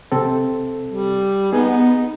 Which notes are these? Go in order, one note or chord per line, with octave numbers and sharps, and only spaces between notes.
C3 C4 A4
G3
B3 D#4 G#4